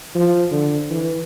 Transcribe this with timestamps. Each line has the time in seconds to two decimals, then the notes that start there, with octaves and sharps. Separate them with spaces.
0.15 F3
0.51 D3
0.90 E3